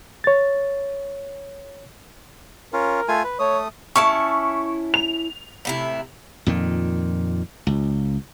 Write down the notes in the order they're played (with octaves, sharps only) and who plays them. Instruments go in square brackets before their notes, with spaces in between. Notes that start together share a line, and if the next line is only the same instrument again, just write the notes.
[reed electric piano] C#5 A6
[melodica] C#4 F4 [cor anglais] A#4
[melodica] A3 F4 G#5
B4
[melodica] A3 D#6 [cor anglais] C#5
[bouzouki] C#4 E4 A5 [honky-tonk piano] C#6
[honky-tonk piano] F7
[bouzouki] A2 C3 E4
[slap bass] F2 A#2 D#3
C#2